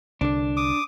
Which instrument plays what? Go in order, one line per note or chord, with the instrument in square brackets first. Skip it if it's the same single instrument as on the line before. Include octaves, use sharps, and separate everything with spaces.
[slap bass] C2 D3 [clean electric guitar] D4
[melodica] D6 D#6